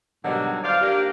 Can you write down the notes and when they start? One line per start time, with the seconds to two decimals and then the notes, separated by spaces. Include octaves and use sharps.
0.24 G#2 B2 D3 D#3 F#3 G3
0.64 F4 C5 D5 F5
0.82 A#3 D4 G4